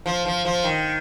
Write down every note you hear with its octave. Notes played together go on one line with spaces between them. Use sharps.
F3
F3
F3
D#3